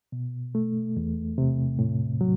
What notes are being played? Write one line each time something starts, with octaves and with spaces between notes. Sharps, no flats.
B2
A3
E2
C3
A2
F#3